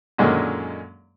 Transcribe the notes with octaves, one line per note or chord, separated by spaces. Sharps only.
F#2 A#2 D3 D#3 G#3 C#4